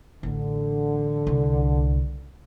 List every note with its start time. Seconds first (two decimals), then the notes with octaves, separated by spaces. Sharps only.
0.23 A1 D3
1.27 C2